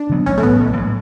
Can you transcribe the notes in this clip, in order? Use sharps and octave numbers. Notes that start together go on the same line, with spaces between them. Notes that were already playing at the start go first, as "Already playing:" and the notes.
Already playing: D4
D3 F#3 B3
A1 C#4
A3
A2 F#3 B3
A1
A2 F#3